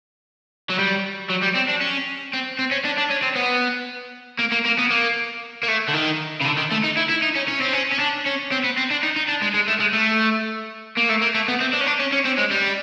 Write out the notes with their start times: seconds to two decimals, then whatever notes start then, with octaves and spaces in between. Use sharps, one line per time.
0.70 F#3
0.79 G3
1.30 F#3
1.43 G3
1.55 C4
1.69 D4
1.81 C#4
2.33 C4
2.59 C4
2.71 C#4
2.85 D4
2.98 D4
3.11 C#4
3.23 C4
3.36 B3
4.39 A#3
4.52 A#3
4.65 A#3
4.78 B3
4.90 A#3
5.63 A#3
5.68 A3
5.88 D3
5.94 D#3
6.41 C#3
6.46 D3
6.58 D#3
6.72 A3
6.84 D#4
6.97 E4
7.09 E4
7.22 D#4
7.35 C#4
7.48 C#4
7.61 C4
7.73 C#4
7.92 C#4
8.00 D4
8.26 C#4
8.52 C4
8.64 B3
8.77 C4
8.90 D4
9.03 D#4
9.16 D#4
9.28 D4
9.42 G#3
9.54 G#3
9.68 A3
9.80 G#3
9.93 A3
10.97 A#3
11.10 A3
11.22 A#3
11.35 A3
11.48 B3
11.60 C4
11.73 D4
11.81 C#4
11.86 D4
11.99 C#4
12.12 C#4
12.25 C4
12.38 G#3
12.51 G3